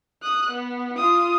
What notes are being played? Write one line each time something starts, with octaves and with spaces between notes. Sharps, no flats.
D#6 F#6
B3
F4 D#6